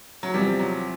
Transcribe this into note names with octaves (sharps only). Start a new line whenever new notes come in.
F#3
E2 C3 F3 G3
F#3